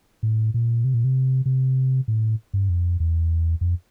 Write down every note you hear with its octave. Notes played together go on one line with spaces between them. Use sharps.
A2
A#2
C3
A#2
C3
C3
A2
G2
F2
E2
F2